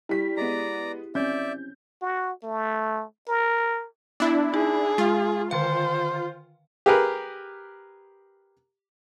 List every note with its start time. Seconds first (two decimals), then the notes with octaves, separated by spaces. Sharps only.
0.09 G3 E4 G4 B6
0.37 G#3 B3 D5 A#5
1.15 C4 C#4 D5 E5 G6
2.02 F#4
2.43 A3
3.29 A#4
4.20 B3 D4 E4
4.54 D#4 G#4
4.98 G#3 F4
5.51 D3 D#3 C5 F5
6.86 G4 G#4 A#4 B4